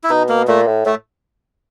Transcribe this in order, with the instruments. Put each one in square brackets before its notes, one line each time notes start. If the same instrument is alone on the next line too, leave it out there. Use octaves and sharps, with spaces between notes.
[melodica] E4
[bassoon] B2 [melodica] D#4
[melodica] A#3
[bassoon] A#2 [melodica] A3
[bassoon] A2
[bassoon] A2 [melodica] A3